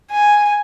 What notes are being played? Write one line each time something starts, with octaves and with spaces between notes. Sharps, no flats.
G#5